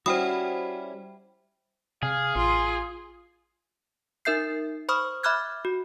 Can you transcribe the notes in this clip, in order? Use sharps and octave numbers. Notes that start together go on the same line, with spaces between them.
G3 C#4 E4 F#4 C5 G5 B5 D#6
C3 G#4 F5
A1 F4 C6
D#4 A#4 E5 G6 C7
C5 B5 C#6 D#6 F6
E5 B5 D6 F6 F#6 G#6
F#4